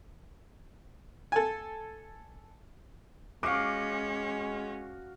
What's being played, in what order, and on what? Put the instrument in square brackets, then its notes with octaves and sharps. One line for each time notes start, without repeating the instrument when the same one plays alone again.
[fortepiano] A4 G#5
[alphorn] G#3 [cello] C#4 [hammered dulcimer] F#4 F5 [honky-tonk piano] D6